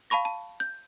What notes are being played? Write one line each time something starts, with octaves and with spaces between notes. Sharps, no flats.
F5 A5 B5 C#6 A#6
A5
G6